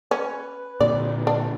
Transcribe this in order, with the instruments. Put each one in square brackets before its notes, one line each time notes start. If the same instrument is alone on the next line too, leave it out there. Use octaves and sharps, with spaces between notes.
[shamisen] C#4 [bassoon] B4
[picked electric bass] A#2 D3 [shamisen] D5
[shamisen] D4